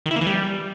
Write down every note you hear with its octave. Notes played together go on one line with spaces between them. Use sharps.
D#3
E4
A#3
E3
G3